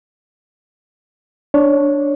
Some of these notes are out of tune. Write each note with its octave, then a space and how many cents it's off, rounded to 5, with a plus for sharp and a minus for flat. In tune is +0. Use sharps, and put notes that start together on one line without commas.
D4 -5 C#5 +0